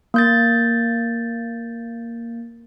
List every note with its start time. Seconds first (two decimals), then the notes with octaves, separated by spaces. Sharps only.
0.14 A#3 G6 A6